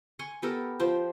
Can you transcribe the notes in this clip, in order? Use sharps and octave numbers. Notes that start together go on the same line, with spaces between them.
G#5 C6 C#6
B3 G4 A4 A#4
F3 G4 C5